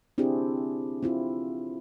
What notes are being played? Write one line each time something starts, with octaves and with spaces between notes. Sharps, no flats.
C4 D4 E4 G4 G#4
C4 E4 F4